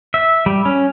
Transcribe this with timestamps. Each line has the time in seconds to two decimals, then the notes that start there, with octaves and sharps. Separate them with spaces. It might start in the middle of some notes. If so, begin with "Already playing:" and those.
0.14 E5
0.46 G3
0.65 C#4